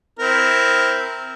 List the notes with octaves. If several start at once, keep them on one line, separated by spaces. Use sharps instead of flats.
C4 E4 A#4